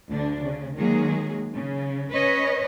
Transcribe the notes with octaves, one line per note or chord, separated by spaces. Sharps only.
D2 D3 D4
C#3
D#3 F#3 G#3 A#3 G#4
C#3
C#4 B4 C#5 D#5